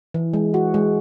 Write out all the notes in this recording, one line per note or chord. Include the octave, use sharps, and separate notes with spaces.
E3
G#3
F#4
G#3